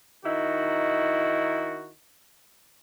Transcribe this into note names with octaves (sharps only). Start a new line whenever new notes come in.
D#3 D#4 E4 F#4